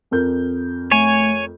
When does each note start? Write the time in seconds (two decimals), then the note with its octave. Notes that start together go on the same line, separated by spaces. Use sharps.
0.11 F2 A#4 G6
0.91 A3 C#5 G#5